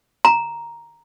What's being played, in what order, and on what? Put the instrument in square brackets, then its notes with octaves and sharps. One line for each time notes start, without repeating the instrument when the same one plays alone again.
[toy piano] A#5